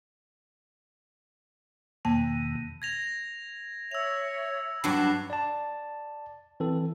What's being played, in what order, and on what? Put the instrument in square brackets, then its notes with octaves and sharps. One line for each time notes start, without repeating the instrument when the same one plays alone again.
[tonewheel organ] E2 B2 D#3 [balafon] A#3 A5
[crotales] G#6 A#6 F7
[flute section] C#5 E5 [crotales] E6 F7
[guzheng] G2 F#3 [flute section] A5 B5 [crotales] D6 F#6 C7
[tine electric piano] D5 A5
E3 C4 A4